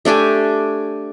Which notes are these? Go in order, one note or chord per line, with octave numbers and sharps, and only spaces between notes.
A3 D4 G4 G#5